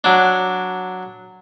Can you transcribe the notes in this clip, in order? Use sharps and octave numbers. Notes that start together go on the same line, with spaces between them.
F#3 D4